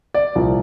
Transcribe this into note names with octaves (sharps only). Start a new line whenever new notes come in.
D5
C2 A#2 F3